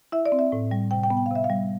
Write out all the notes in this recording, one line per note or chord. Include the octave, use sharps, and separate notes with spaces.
E4 E5
D5
C4
E5
A2
G3
C3 G5
G5
B3
G5
F5
C3 E5
F5
G3